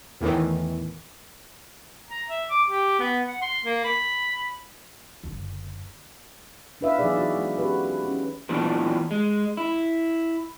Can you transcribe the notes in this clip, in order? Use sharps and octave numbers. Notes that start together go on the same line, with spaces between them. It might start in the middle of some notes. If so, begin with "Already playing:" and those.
E2 A2 D#3 E3
A#5
E5
D6
G4
B3
F#5
C6
A#3
B5
F#1 D3
D4 B4 E5 F5
E3 F#3 B3 D#4 G#4 D5
F#4
G#3
C#4 F#4 G4 B4
C#4
E2 A#2 E3 F#3 D4
G#3
E4